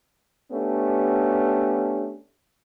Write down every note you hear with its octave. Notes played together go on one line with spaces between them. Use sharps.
A3 B3 C#4 D4 G4